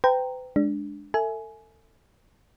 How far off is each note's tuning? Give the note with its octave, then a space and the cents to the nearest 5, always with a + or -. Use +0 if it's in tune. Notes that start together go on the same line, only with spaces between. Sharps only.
B4 +45 G5 +0 A#5 -5
G#3 +0 D4 +0
A4 +30 E5 +0 G#5 +20